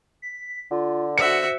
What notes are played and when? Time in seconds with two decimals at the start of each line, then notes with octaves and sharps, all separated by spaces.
0.22 B6
0.71 D3 F4
1.18 F#4 C5 E5 C#7